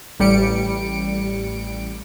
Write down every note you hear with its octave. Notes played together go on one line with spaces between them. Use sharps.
A1 G3 C#7 D7